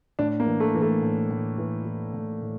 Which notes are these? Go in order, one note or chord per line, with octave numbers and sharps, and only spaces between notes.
A2 D4
A#3
E3
A3
E3
A3
A2
A2
E3
E3
A2
A2